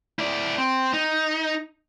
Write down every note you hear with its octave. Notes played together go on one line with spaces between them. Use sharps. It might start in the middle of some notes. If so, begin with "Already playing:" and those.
E4 D5
C4
D#4